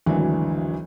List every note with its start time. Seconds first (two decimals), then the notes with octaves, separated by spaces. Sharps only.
0.06 G#1 D2 E3 F#3 D4